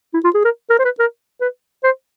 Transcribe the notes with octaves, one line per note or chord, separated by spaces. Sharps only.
E4
F4
G#4
A#4
A#4
C5
B4
A#4
B4
C5